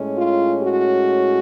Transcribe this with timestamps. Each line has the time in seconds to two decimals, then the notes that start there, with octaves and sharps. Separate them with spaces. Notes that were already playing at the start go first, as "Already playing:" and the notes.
Already playing: A2 G#3 C#4
0.18 F4
0.61 F#4